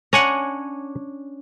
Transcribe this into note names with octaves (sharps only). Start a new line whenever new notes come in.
C#4 D4 F#5 G#5 A#5